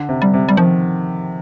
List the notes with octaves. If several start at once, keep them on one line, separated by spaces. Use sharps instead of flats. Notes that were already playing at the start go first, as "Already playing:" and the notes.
Already playing: D3
C3
G3
C3
G3
D#3 F3